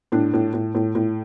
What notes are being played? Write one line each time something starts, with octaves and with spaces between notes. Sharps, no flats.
A2 D4
A2
A2
A2
A2